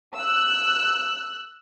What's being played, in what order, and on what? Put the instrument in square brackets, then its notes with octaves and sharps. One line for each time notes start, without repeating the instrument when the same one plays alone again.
[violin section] E6 F#6